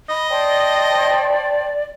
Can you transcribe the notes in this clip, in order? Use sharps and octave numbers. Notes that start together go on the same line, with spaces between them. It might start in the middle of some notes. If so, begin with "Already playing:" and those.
D#5 B5
C5 D5 G5 A5